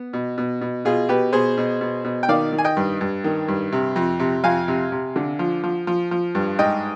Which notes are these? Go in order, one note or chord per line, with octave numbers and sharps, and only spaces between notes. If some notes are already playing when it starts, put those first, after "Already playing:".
Already playing: B3
B2
B2
B2
B2 F4 G#4
B2 G4 B4
B2 G#4 C5
B2
B2
B2
G5
D#3 D5 F5
D#3
G#5
D#5 G5
G2
G2
D#3
G2
C3
F2
C3
F2 F5 G#5
C3
C3
D3
F3
F3
F3
F3
G2
G#2 D#5 G5